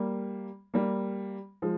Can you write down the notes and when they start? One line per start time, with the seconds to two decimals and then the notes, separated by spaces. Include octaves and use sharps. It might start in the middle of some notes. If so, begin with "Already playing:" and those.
Already playing: G3 A#3
0.74 G3 A#3
1.62 F3 G#3